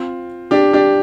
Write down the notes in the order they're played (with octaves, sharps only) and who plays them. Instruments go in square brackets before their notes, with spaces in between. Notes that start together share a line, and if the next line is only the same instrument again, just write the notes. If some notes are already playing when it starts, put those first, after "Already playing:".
Already playing: [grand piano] C4 F4
D4 G4
D4 G4